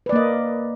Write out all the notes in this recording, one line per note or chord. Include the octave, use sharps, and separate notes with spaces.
A#3 B4 D5 D#5